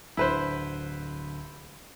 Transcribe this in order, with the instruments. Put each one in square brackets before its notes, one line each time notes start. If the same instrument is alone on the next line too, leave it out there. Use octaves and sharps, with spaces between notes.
[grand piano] D1 D3 [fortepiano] E4 B4 C5